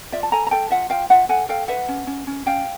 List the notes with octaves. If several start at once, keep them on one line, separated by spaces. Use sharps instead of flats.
F4 D5 E5
A5
A4 G#5 A#5
A#5
A4 G5 A5
F4 E5 F#5
F4 F5 G5
F4 E5 F#5
A4 F#5 G#5
A4 F5 G5
B4 E5 F#5
C#4
C#4
C#4
C#4 F5 G5